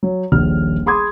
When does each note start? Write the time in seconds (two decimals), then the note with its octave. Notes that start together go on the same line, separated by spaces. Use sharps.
0.03 F#3
0.32 D#1 A#1 F6
0.86 G#4 B5 C6 D6 D#6 G#6